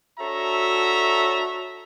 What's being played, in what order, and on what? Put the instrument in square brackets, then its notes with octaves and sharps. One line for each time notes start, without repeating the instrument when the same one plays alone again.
[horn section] D4 F#4 A4 C#5 E5 A#5